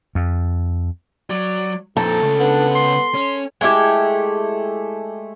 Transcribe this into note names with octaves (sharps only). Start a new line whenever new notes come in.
F2
F#3 D5
F2 A#2 D#4 A4
C#2 C#3 A3
B3 D4
C6
C#4
G#3 A3 E4 G4